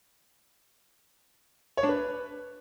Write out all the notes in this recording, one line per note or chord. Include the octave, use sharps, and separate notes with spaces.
C#5
D4
B4